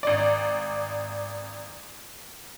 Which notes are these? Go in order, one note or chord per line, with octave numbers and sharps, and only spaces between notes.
G#1 D5